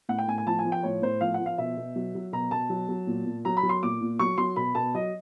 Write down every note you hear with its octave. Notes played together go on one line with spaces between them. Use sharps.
A2 F#5
G5
A2 G#5
G#5
F3 A5
G#5
F3
G5
A2 C#5
A2 C5
F3 F5
F#5
F3
F5
B2 E5
B2
F#3
F#3
B2 A#5
B2 A5
F#3
F#3
A#2
A#2
F#3 A#5
B5
F#3
C6
A#2 D6
A#2
F#3 C#6
F#3 C6
B2 B5
B2 A5
F#3 D#5